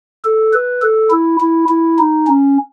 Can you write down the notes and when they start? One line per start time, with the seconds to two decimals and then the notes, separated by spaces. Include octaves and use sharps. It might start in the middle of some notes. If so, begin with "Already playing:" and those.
0.25 A4
0.53 B4
0.82 A4
1.11 E4
1.41 E4
1.69 E4
1.98 D#4
2.27 C#4